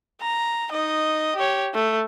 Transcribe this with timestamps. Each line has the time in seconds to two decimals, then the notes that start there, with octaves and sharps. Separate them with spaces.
0.22 A#5
0.71 D#4 D#5
1.36 G4 C#5
1.74 A3